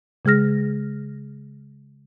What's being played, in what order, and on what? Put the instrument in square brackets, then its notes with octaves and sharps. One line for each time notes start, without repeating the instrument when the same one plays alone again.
[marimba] C#3 G#3 G#4 F6 A#6